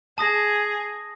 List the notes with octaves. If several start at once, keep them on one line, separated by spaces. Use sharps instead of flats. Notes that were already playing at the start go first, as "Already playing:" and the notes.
G#4 A5 D#6 A#6